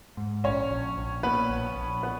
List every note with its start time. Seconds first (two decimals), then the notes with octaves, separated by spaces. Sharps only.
0.17 G#2
0.44 A#1 C#4 C#5
0.71 A#1
0.97 A#1
1.23 A#2 B3 B4
1.50 A#1
1.76 A#1
2.03 B3 B4